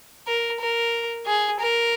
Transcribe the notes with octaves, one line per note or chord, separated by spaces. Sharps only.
A#4
A#4
G#4
A#4